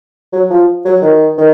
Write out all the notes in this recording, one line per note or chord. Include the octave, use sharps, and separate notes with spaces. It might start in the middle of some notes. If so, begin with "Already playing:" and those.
F#3
F3
F#3
D#3
D#3